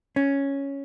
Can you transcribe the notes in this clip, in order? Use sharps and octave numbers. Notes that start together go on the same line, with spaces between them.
C#4